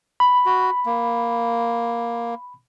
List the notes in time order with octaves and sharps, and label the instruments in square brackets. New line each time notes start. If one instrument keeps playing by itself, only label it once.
[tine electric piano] B5
[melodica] F#4
A#3